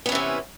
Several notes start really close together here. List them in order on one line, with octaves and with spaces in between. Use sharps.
B3 C#4 E3 C3